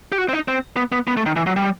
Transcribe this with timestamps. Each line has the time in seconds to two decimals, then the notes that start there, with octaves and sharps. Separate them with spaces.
0.12 G4
0.18 F#4
0.29 C4
0.33 D#4
0.48 C4
0.77 B3
0.92 B3
1.07 B3
1.17 A3
1.26 D#3
1.36 E3
1.46 F#3
1.56 G3